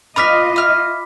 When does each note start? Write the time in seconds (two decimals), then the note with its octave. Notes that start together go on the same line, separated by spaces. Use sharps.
0.16 D4 F4 B4 D#5 B5 D6 F6 B6
0.56 E4 F6